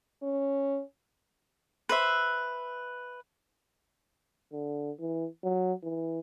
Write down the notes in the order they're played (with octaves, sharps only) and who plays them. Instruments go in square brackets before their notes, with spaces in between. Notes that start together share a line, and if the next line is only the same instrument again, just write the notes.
[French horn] C#4
[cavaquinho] B4 C5 E5
[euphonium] D3
E3
F#3
E3